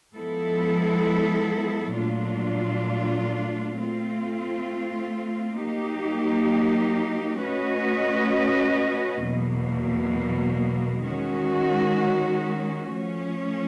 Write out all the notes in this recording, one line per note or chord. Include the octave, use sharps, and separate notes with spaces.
F3 G#3 B3 E4 A4
A#2 F#3 A3 D4 F4
A3 C4 F4
F#3 A#3 D#4 G4
A3 C#4 F#4 B4 D#5
E2 B2 F#3 A#3
D#3 G#3 C#4 F#4
F3 A3 C#4